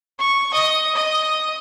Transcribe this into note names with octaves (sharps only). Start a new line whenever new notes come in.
C#6
D#5
D#5